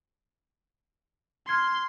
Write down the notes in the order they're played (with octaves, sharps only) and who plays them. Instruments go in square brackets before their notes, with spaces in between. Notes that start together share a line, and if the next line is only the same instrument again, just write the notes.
[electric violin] C6 [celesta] F6 G#6 C7